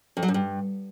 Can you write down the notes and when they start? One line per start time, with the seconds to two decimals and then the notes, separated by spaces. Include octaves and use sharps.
0.17 F2
0.23 F#3
0.28 F#2
0.34 G2